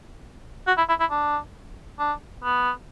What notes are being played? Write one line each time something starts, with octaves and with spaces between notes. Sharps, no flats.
F#4
E4
E4
E4
D4
D4
B3